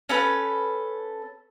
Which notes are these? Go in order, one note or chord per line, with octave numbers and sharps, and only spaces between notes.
C#4 A4 B4